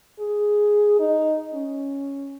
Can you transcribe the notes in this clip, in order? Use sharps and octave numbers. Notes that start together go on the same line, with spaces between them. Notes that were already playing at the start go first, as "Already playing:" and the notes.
G#4
D#4
C#4